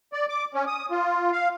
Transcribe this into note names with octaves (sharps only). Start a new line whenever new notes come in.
D5
D6
C#4
D#6
F4
F5